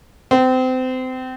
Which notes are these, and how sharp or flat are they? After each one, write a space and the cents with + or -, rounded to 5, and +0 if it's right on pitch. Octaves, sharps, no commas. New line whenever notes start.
C4 -30